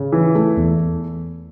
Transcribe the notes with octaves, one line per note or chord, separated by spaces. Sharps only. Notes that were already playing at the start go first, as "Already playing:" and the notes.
Already playing: C#3
E3
A3
E2